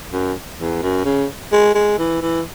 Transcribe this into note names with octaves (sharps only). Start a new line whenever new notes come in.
F#2
E2
F#2
C#3
G#3
G#3
E3
E3